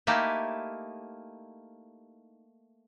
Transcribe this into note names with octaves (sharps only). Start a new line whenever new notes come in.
A3 A#3 D#4 E4 G4